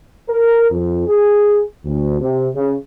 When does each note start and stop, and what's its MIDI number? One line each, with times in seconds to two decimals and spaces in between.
0.29 0.66 70
0.71 1.07 41
1.07 1.62 68
1.85 2.20 38
2.21 2.48 48
2.55 2.74 49